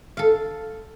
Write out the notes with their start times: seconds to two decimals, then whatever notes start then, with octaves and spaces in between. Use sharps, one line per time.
0.17 A4 F5